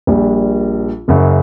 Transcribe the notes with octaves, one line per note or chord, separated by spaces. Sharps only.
A#1 A#2 G3
F#1 F#2 C#3